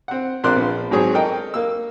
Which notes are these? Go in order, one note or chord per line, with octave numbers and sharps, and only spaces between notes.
C4 F#5
A#1 C4 A#4 D5 C6 F#6
A#1 B3
G#2 F#3 C4 G#4 C#5
A4 A#4 D#5 G5
A#3 E6